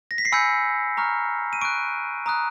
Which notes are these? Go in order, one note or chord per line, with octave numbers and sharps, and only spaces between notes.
A#6
B6
C7
G#5 B5 E6 G6 C#7
A#5 C#6 F6
D#7
C#6 F#6 D7
A#5 D#6 F#6